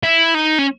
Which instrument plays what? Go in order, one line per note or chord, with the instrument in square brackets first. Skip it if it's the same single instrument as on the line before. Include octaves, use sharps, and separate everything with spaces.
[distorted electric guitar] E4
D#4
C#4